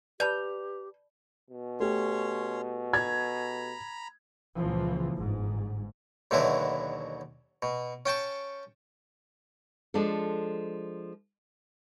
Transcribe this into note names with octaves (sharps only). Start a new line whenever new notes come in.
G4 B4 D5 A5 B5 G6 F7
B2
A3 C#4 G4 C#5 C6
A#5 B5 G#6
C#2 A#2 E3 F3
G1 G#2
D#2 B2 D3 E3 F#3 E4
B2
C#4 G5 A5 C#6
F3 G#3 D4 A4